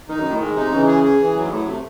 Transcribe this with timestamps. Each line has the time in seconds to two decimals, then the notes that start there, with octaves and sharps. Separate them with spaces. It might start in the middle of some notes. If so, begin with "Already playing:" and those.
0.09 D#3 D#4
0.20 F#2
0.24 D#3
0.30 A2
0.40 G#2 G#3
0.56 C3 D#4
0.72 C#3 E3
0.87 G#4
1.04 G#4
1.20 E3
1.36 F#3
1.44 G#2
1.51 A2 F#3
1.66 C3 A3